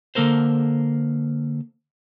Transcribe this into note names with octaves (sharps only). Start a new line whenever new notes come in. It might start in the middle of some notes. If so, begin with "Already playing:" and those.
D3 A#3 A4 A#4 C5